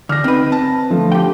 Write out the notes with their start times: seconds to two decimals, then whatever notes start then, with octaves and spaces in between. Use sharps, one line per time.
0.09 D3 F6 A#6
0.24 C4 D#4 B4
0.52 A5
0.90 D3 F3 A3
1.12 G4 G5